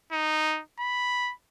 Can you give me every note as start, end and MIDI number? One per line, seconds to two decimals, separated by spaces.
0.12 0.61 63
0.79 1.32 83